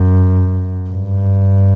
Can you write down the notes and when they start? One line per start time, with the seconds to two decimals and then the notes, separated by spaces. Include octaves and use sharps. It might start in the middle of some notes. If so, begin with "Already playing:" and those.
Already playing: F#2
0.90 G2